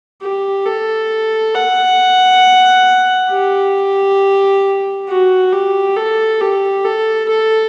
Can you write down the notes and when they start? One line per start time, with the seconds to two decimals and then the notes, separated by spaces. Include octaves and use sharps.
0.22 G4
0.66 A4
1.55 F#5
3.31 G4
5.09 F#4
5.53 G4
5.97 A4
6.41 G4
6.85 A4
7.29 A4